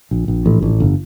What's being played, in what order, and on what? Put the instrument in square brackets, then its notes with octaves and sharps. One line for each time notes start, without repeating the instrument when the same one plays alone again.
[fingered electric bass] A#1
A#1
A1
A1
G1